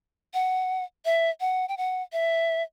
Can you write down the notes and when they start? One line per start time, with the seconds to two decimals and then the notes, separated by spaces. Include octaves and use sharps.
0.34 F#5
1.05 E5
1.40 F#5
1.69 G5
1.77 F#5
2.13 E5